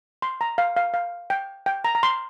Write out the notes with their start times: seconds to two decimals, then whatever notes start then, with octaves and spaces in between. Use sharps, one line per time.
0.22 C6
0.41 A#5
0.58 F5
0.77 F5
0.94 F5
1.30 G5
1.66 G5
1.85 A#5
1.95 A#5
2.03 C6